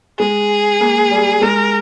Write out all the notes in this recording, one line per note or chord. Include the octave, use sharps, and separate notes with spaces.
G#3 G#4
A#3
G3
G#3 A#4